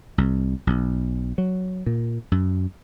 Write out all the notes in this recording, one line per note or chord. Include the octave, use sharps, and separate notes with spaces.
C2
B1
F#3
A#2
F#2